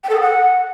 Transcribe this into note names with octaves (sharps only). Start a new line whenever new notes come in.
G5
A4
D#6
F#5